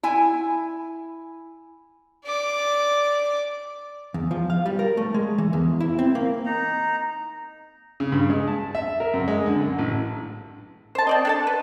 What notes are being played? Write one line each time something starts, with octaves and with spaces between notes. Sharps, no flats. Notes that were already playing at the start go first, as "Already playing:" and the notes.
E4 G#5
D5 D6
E2
F3
F5
G3
A#4
A3
G#3
E3
E2
E4
C4
A#3
D#4 A#5
C#3
G2
G#3
A5
E5
A#4
F#2
G#3
D3
F#2
A1
C5 A5
C4 D5 D#5
D4 A4 A5
B4